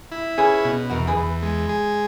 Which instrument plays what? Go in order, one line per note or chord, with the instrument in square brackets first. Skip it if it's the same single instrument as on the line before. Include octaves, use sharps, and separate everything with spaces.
[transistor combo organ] E4
[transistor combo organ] C#4 [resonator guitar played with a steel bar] G#4 B4
[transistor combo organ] B2
[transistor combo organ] E2 [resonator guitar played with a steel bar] F#4 A#4
[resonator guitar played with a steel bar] G#4 B4
[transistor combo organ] E2
G#3
G#4